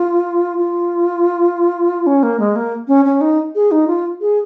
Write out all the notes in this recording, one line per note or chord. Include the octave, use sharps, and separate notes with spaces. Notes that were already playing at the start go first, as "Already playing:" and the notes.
Already playing: F4
F4
C#4
A#3
G#3
A#3
C#4
C#4
D#4
G#4
D#4
F4
G#4